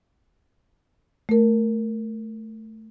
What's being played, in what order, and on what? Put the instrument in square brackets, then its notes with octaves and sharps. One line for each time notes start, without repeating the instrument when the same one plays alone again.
[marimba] A3 A#4